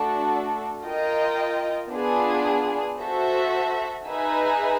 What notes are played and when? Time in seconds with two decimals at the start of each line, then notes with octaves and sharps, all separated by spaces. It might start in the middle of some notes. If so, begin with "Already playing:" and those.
Already playing: A3 D4 F#4 A4
0.85 F4 A#4 D#5 G5
1.92 B3 D4 F4 G#4
3.00 F#4 A4 C5 E5
4.08 D#4 G#4 B4 E5 G#5